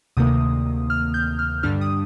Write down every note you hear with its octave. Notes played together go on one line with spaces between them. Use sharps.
D2 C3 D#3 A#3 D#6
F6
G6
F6
G2 D3 G3 D4 F6
D#6